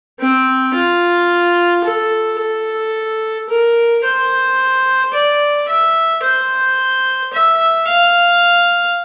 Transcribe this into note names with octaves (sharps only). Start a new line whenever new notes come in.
C4
F4
A4
A4
A#4
C5
D5
E5
C5
E5
F5